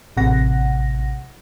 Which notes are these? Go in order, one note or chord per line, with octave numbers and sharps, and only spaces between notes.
A1 C3 F#5 A#6